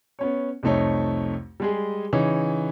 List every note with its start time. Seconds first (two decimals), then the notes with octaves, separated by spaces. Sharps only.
0.19 B3 C#4 C#5
0.63 C2 F2 A3 D#4 C#5
1.60 G3 G#3 G#4
2.13 C#3 E3 D#4 C#5